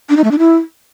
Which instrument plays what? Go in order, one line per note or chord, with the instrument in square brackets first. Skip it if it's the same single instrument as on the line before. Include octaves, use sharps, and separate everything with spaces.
[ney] D4
D#4
A3
D4
E4